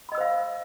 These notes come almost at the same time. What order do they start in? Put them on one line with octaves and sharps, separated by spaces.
B5 D#5 E6 C5 F5